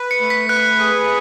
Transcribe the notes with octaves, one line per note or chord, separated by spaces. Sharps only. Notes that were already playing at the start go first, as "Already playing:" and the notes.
Already playing: B4
C#7
A3
B6
B4 F#6
G#4